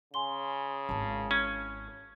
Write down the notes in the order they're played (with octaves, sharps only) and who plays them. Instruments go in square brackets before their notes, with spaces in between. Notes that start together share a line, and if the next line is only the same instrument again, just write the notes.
[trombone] C#3 [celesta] G#5 C6 G7
[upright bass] G#1 E4 [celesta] A5
[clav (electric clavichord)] C#4 [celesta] G#6